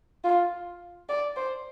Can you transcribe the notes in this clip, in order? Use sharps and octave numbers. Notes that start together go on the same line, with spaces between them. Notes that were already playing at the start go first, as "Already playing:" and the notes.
F4
D5
C5